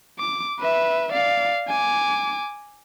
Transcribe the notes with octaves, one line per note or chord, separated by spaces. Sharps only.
D6
B4 E5
D5 F5
G#5 D6